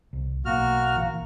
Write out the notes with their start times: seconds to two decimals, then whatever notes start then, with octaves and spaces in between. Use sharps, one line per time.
0.13 C2
0.45 B1 B2 A#3 F#4 F6
0.96 A#1 E3